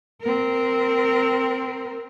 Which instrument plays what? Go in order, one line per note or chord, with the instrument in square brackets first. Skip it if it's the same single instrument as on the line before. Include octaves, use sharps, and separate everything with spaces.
[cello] C4 A#4